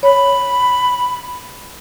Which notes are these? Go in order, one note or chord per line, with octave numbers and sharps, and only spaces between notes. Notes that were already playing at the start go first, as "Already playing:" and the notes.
C#5 B5